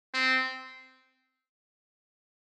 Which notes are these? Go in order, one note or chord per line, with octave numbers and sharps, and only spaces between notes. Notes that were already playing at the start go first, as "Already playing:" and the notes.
C4